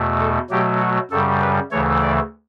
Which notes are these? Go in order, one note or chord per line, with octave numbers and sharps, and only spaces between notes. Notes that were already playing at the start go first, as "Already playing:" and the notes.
Already playing: E2 B2 A3
A4
B2 F#3 A3 G4
F#4
F#2 C#3 G3 A4
B4
D2 C#3 E3 A3 C#5
D5